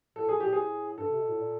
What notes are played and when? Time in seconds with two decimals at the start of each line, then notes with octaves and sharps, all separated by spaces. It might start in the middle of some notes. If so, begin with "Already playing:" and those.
0.16 A2 A4
0.26 A#2 G#4
0.35 A2
0.40 A#2 G4
0.53 A2 G#4
0.98 G2 A4
1.08 C3
1.19 B2
1.29 A2
1.39 A#2